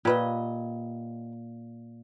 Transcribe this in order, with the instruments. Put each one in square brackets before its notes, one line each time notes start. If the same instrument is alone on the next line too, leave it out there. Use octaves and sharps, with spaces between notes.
[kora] A#2 [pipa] G4 B4 D#5